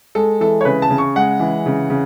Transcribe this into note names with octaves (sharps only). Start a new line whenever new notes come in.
G#3 A4
E3 A4
C#5
C#3 B4
A5
C#3
C#6
G#3 F#5
E3
C#3
C#3